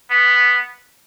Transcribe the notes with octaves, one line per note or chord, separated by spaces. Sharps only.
B3